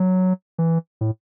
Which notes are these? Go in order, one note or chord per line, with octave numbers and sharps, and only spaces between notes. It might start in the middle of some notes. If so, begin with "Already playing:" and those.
Already playing: F#3
E3
A2